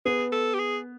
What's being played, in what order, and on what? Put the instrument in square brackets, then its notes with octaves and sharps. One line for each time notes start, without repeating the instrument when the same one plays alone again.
[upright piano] B3 [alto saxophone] G#4
[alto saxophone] A4
G4
G#4